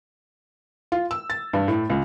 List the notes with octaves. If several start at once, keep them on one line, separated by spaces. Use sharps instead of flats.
F4
E6
A6
G2
A2
C#2